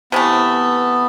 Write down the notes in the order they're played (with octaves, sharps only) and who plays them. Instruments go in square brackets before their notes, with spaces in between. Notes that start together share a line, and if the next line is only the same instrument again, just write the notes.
[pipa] C3 E3 A3 [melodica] B3